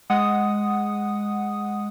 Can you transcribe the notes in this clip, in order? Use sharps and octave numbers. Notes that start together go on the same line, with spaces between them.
G#3 F#5 D#6